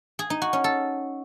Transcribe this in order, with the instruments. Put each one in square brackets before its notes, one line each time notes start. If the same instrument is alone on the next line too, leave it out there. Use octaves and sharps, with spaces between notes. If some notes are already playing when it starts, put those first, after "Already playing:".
[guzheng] G#4
D#4
F#4
C#4
A4